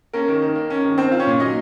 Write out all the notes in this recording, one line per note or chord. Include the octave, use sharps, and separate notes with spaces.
A#3 C#4 A#4
D#3
D#3
A#3
C#4
D#3
C4 C5
F4
C#4 C#5
A#2
F#3 D#4 D#5